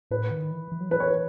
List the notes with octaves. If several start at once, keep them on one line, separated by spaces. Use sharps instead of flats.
A2 B4
D#3
E3
E3
F#3
E3 B4
C#5
B4